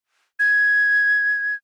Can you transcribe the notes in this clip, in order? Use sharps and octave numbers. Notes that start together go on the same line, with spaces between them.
G#6